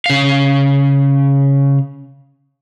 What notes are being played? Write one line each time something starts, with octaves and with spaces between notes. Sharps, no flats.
C#3 F5